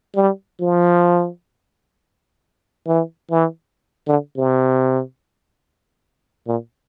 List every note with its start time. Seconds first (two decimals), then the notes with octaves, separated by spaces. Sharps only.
0.15 G3
0.61 F3
2.87 E3
3.31 E3
4.07 D3
4.37 C3
6.47 A#2